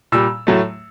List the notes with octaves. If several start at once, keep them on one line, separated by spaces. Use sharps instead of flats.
A#2 G3 E6
A2 F#3 A3